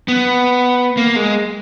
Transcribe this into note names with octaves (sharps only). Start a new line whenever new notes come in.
B3
A#3
G#3